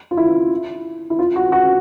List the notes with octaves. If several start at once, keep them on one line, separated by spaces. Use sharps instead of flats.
F4
E4
E4
F4
F#4
F#4